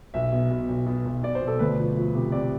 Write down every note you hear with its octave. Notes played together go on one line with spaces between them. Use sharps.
B1 E5
B2
B2
B1
B2
B1
B2 D5
C5
B2
A4
D2 B4
F3
F3
C3
C3 D5